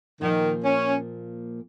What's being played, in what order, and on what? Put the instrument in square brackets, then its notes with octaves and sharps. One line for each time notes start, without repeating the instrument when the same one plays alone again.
[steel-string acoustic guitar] A#2 F3 A#3 [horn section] D#3
[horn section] C#4